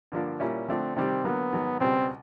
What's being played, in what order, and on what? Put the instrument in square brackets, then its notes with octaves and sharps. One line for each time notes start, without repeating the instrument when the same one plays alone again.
[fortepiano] G2 D3 F3 A#3 D4
A#2 G3 A#3 C#4 E4
[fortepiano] D3 F3 A3 D4 [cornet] C4
[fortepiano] C3 D#3 G3 [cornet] C4
[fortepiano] D3 F#3 A#3 [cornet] B3
[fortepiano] G#2 D#3 F#3
[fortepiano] C#2 B2 G3 [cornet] C4